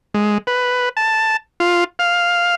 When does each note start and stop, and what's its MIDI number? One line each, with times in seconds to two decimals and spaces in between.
0.14 0.38 56
0.47 0.89 71
0.97 1.37 81
1.60 1.84 65
1.99 2.55 77